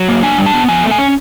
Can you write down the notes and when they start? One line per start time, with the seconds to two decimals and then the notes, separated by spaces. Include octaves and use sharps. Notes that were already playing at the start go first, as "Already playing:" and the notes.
Already playing: F#3
0.08 A#3
0.23 D4 G#5
0.38 G3
0.46 A5
0.54 B3
0.69 F3 G#5
0.84 A3
0.91 G#5
0.98 C#4